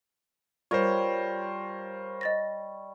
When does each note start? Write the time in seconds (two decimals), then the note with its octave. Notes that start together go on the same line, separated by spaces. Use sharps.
0.71 G3 F4 A#4 C5 C#5
2.21 D#5 A6 A#6